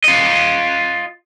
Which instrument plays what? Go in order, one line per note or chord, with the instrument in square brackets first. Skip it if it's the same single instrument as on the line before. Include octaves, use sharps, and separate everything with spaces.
[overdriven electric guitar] F4 D#5